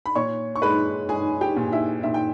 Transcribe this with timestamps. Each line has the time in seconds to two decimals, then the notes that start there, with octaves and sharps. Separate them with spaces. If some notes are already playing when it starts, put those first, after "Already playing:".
0.06 B5
0.15 A#2 C#5 C#6
0.56 C#6
0.62 G#3 B4 B5
1.09 G#3 G#4 G#5
1.41 G4 G5
1.57 A#2
1.72 E4 E5
2.03 A#2 E5
2.14 G5